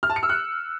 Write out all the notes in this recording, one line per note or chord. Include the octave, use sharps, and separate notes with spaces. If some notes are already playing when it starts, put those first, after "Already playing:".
F6
A5
C#7
E6
F#6